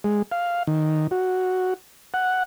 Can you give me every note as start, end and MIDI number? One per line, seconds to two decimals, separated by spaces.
0.04 0.22 56
0.32 0.63 77
0.67 1.07 51
1.11 1.74 66
2.14 2.43 78